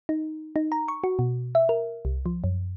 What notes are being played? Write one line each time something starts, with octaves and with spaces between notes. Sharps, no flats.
D#4
D#4
A#5
C#6
F#4
B2
E5
A#4
C2
F3
F#2